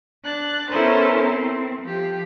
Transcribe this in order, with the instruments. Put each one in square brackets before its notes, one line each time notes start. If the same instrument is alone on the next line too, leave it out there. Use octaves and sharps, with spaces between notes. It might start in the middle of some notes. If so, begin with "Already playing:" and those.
[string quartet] D4 F#6 A6
B3 C#4 E4 A4 A#4 C5
C4
F3 G4